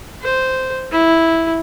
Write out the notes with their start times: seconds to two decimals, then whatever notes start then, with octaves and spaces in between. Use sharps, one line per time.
0.22 C5
0.91 E4